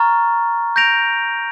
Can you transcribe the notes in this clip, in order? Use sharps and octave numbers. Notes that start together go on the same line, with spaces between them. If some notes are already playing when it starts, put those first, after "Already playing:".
Already playing: A#5 C#6 F6 A6
G6 A#6 D7 F7